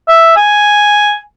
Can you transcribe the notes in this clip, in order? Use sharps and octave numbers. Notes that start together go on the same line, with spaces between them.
E5
G#5